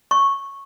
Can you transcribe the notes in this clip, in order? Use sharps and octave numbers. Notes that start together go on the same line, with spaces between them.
C#6